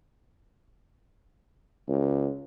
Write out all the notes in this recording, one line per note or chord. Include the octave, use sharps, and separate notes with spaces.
C#2